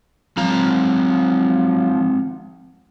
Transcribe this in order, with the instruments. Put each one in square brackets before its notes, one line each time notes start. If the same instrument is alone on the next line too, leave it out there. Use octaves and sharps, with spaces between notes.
[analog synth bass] F3 [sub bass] F#3 [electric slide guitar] G#3 C4 A#5